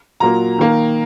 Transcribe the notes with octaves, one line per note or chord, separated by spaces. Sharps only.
A#2 F#3 A#3 A#5
D#3 A#3